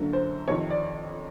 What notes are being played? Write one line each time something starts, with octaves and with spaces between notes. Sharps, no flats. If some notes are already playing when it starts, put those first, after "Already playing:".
Already playing: F#2 D3 F#3 A#3
C5
F2 C3 D#3 C#5
D5